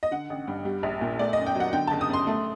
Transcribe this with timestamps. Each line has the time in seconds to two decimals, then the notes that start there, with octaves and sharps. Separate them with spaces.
0.03 D#5
0.11 D3 F#5
0.30 A1
0.47 G2
0.65 G3
0.83 A#1
1.01 A#2
1.19 A3 D5
1.33 D#5
1.38 F#2
1.46 G5
1.55 F#3
1.60 F#5
1.73 D3 G5
1.87 F#1 A5
2.01 D#6
2.09 F#2 C6
2.27 A3